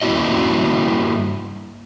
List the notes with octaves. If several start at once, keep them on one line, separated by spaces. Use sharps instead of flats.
G2 A#3 E4 F#4 D#5